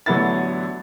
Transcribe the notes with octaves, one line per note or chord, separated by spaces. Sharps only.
A1 D3 F#3 B3 E4 A6